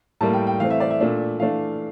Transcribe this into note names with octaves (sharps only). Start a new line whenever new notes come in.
A2 G3 A#3 A5
G5
G5
E3 A3 C4 F5
E5
D5
E5
A#2 A3 D4
E3 A3 D4 F5